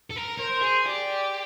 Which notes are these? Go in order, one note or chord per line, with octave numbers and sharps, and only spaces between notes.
A4
A#4
A#4 C5
G#4
G4 D5